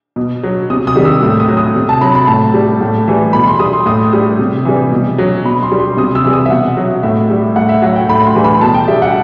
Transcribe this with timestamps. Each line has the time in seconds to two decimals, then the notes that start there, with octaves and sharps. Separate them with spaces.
0.16 B2
0.43 F#3
0.70 C3 D#6
0.87 D#6
0.95 D#3 G3
1.05 E6
1.23 A2 E6
1.40 D#6
1.48 F#3
1.57 D#6
1.76 C3
1.89 A5
2.01 F#3 B5
2.15 B5
2.27 A2 A5
2.54 G3
2.81 A2
3.08 E3 G3
3.33 B2 B5
3.47 C6
3.59 G3 D#6
3.73 C6
3.86 A2 D#6
4.13 G3 D#6
4.39 C3
4.65 E3 G3
4.91 B2
5.18 F#3
5.44 B2 B5
5.62 C6
5.72 G3
5.79 C6
5.97 C3 D#6
6.15 E6
6.24 E3 G3
6.33 D#6
6.46 E5
6.50 B2 F#5
6.77 F#3
7.03 A2 E5
7.30 G3
7.56 A2 F#5
7.69 E5
7.82 F#3 F#5
7.96 G5
8.09 A2 B5
8.26 C6
8.35 E3 G3
8.44 B5
8.61 B2 A5
8.74 G5
8.88 G3 E5
9.02 F#5